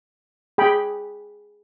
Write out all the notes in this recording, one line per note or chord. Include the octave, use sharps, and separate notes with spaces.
G#4 G5 B5